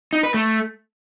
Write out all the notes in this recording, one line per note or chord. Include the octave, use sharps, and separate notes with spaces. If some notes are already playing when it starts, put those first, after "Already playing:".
D#4
B4
A3